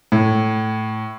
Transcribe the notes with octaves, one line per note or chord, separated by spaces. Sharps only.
A2